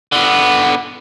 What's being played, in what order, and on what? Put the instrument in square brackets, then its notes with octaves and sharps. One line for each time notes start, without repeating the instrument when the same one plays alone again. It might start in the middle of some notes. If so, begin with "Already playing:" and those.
[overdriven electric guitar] D3 B3